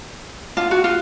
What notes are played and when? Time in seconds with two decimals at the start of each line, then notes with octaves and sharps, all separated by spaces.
0.57 F4
0.71 F#4
0.84 F4